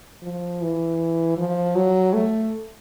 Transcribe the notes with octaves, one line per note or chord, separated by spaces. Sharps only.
F3
E3
F3
F#3
A3